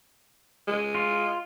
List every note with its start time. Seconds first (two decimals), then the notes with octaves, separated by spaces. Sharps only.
0.68 G#3
0.95 F4